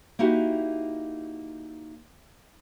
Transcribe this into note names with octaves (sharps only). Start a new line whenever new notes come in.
A#3 D#4 E4 F#4 G4